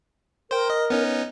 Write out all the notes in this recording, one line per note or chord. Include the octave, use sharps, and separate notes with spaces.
A#4 C5 G5
D#5
B3 C#4 D#4